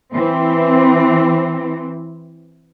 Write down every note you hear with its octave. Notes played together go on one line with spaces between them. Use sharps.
E3 C4